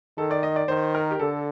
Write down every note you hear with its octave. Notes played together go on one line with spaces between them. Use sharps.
D#3 A4
D5
D#5
D5
D#3 C5
A#4
G4
D3 A4